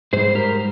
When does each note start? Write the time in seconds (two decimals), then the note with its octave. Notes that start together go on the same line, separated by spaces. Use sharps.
0.13 G#2 G3 G#4 C5
0.35 G4 A#4